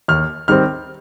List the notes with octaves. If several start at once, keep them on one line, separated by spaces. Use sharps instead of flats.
D#2 F6
D#3 G3 C4 F6